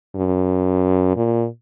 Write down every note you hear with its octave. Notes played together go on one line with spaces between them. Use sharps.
F#2
A#2